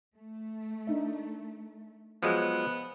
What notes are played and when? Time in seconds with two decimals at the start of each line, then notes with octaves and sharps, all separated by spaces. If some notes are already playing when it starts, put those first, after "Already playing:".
0.15 A3
0.87 D4 D#4 E5
2.23 F3 F#3 G#3 B3